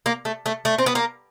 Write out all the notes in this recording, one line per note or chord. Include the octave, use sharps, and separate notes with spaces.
A#3
A3
A3
A3
C4
B3
A#3